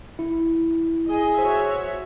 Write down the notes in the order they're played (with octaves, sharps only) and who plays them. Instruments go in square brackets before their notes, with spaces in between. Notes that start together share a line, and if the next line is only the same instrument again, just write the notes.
[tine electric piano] E4
[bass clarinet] G#4 [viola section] D#5
[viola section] F#4 C#5 E5 [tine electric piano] C5